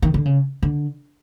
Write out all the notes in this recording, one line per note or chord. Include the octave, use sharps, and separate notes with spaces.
D#3
D3
C#3
D3